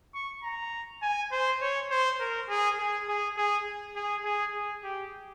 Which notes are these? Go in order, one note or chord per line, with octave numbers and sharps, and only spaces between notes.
C#6
A#5
G#5
C5
C#5
C5
A#4
G#4
G#4
G#4
G#4
G#4
G#4
G#4
G4